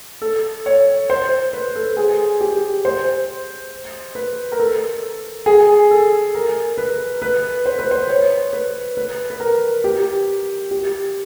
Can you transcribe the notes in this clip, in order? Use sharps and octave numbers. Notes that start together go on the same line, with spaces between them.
A4
C#5
C5
B4
A4
G#4
G4
C5
B4
A#4
A4
G#4
A4
A#4
B4
B4
C5
B4
C5
C#5
B4
B4
B4
A#4
G4
G4